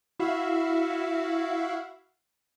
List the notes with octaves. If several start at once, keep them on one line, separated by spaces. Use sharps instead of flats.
E4 F#4 E5 F5